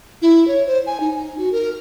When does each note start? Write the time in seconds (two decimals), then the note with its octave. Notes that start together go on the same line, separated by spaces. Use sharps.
0.22 E4
0.48 C#5
0.67 C5
0.86 G#5
1.00 D#4
1.38 F#4
1.52 A#4